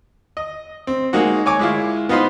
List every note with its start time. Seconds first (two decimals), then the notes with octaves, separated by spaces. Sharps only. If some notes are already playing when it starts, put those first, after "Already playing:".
0.37 D#5
0.87 C4
1.13 G#3 A#3 D#4 F#4
1.46 C#5 G#5 D6
1.59 G#3 E4 F4
2.09 B3 D#4 F4 B4 C5